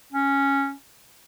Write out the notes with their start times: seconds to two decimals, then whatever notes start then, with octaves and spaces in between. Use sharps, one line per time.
0.12 C#4